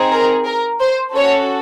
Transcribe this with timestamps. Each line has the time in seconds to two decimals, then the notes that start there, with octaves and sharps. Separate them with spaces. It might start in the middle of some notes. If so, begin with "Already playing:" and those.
Already playing: C4 D#4 G#4
0.12 A#4
0.46 A#4
0.80 C5
1.15 C#4 F#4 A4 C#5